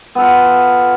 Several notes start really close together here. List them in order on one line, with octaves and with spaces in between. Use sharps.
B3 A4 F4